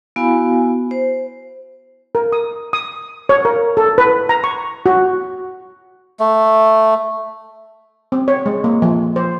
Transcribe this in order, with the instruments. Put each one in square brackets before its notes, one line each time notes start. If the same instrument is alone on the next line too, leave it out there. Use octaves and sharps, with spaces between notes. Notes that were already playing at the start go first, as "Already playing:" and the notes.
[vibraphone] B3 E4 F#4 F5 G#5 B5
C5
[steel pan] A#4
D#6
D#6
C#5
A#4
A4
B4
A#5
C#6
F#4
[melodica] A3
[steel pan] C4
C#5
G#3
A#3
F3
C5